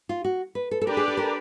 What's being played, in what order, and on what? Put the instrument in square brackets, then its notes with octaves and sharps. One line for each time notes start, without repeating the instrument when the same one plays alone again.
[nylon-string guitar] F4
F#4
B4
A4
A4
[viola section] D4 G4 B4 D5 [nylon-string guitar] A#4
[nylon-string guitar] G#4
A4
A#4